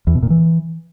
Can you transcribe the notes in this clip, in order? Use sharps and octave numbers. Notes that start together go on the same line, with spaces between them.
E2
B2
A#2
E3